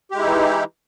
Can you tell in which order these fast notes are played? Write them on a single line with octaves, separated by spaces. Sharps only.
G4 G#3 E4 D#4 E3